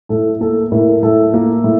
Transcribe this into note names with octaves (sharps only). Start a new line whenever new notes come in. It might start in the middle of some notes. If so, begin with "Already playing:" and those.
A2 A4
A#3 A4
A2 A#4
A2 A4
A#3
A2